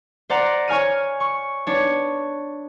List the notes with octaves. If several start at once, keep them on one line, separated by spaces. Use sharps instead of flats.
C5 D5 F#5 A#5
C#5 G#5 F6 D#7
C#6
B3 D4 C#5